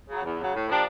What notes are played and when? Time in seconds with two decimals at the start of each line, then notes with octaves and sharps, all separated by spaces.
0.08 C#3 F#3
0.23 E2
0.38 C#3 F#3
0.54 A2
0.68 F3 A#3 D4 G4